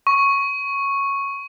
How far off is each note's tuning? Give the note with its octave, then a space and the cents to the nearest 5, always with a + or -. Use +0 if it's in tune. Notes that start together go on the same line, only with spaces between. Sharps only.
C#6 -5